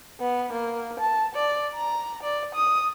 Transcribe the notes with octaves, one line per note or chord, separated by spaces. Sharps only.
B3
A#3
A5
D5
A#5
D5
D#6